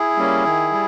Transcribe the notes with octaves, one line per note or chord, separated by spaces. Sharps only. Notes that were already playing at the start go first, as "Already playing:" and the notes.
Already playing: E4 G#4
G3 A#3 C#4
D#3
G3